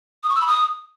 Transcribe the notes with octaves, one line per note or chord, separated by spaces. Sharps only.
D#6
C#6
E6
B5
D#6